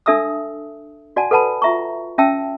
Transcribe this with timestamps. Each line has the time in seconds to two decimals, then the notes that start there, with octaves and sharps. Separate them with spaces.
0.06 D4 A4 E5 A5 D#6 E6
1.16 F#4 D5 F#5 G#5 A5
1.31 A4 B4 F#5 A5 B5
1.62 F4 E5 A#5 C#6
2.18 C#4 E5 G5 A5 E6